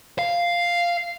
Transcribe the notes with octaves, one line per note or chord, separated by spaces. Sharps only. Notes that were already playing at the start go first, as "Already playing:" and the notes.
F5